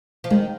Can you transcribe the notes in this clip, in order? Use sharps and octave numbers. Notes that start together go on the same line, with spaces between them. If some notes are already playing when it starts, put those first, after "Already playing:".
F3
D#3 G#3